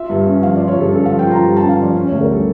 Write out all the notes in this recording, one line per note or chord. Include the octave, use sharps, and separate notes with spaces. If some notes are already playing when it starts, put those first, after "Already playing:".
Already playing: F4 E5
G2
C#4
F3 F5
F4 D5
C#5
G2 A4
C#4 A4
F3 F5
G5
F4 A#5
G2
C#4 A5
F5
F3 D5
C#4
D2 C#5
A#4
G3 A4